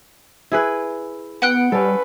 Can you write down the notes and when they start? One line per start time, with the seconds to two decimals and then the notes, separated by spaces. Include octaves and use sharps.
0.52 E4 G#4 B4
1.42 B3 F#5 G5 F#6
1.72 G3 C#4 A4 B4